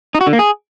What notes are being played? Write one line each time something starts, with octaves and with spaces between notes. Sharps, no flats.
D#4
F#4
D3
A#3
G#4